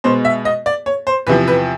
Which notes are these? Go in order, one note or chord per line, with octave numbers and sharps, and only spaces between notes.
B2 G#3 B3 C5
E5
D#5
D5
C#5
C5
E2 C3 F3 B4
B4